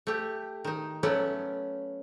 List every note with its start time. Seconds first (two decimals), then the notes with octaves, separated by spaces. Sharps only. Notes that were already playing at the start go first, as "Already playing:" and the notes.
0.07 A3 G4
0.64 D#3 D#4
1.03 F#3 A3 B3 C#4 D5